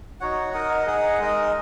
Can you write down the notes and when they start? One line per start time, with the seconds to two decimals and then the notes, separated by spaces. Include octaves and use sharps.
0.20 D#4 F#4 C#5 F#5
0.53 D#4 A#4 D#5 F#5
0.86 D#4 G#4 D#5 F#5
1.19 G#3 D#4 A#4 D#5